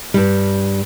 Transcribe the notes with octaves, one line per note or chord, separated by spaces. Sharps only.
G2 G3